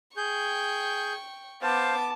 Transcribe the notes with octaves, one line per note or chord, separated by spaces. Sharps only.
G#4 G5 C#6 G6
B3 C5 F5 A5 D6